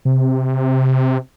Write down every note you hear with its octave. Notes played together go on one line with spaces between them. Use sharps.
C3